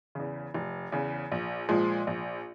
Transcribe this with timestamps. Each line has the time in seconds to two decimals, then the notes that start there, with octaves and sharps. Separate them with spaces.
0.15 E2 C#3
0.54 F1
0.92 E2 C#3
1.31 A#1
1.69 A#2 F3 G#3
2.07 A#1